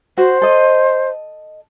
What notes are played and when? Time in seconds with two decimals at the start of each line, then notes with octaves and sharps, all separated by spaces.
0.18 F#4 C5
0.42 A4 D#5